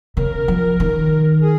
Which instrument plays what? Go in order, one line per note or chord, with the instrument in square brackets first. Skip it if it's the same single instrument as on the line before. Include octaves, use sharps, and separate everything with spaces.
[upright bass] C#3 [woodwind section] A#4
[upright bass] F3
D#3
[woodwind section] G#4